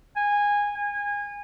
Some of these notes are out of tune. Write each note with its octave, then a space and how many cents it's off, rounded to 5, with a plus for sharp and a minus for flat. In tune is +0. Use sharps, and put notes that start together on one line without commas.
G#5 -15
G#5 -25